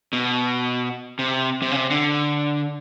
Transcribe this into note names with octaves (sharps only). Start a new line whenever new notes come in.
B2
C3
C3
C#3
C3
D3